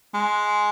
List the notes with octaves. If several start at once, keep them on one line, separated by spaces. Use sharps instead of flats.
G#3